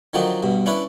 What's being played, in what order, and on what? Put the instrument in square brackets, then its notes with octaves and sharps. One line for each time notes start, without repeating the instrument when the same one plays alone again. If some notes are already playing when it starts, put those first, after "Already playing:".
[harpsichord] D3 D#3 F3 F#3 D4 D#4
G2 B2
C#4 D4 E4 B4